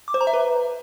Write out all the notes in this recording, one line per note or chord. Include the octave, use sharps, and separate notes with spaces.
D6
C5
A#5
E5
B4